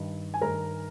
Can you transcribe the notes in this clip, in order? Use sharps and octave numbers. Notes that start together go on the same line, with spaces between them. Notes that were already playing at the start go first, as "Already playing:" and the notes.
Already playing: G2 D#3
G#5
G2 D#3 A#4 A#5